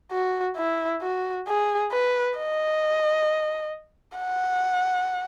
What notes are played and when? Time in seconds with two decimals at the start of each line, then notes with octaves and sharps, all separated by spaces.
0.12 F#4
0.57 E4
1.02 F#4
1.47 G#4
1.92 B4
2.38 D#5
4.18 F#5